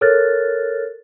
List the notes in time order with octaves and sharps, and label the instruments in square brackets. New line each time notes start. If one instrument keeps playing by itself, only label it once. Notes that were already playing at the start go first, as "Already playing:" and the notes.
[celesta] A4 A#4 C#5 F6 F#6 A6